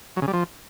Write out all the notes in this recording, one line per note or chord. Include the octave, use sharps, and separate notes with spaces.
F#3
C#3
G3
F3